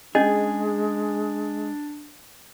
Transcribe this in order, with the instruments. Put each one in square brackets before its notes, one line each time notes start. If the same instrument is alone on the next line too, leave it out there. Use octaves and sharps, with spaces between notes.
[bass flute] G#3 [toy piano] C#4 D#5 [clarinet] D4 [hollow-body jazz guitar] G#4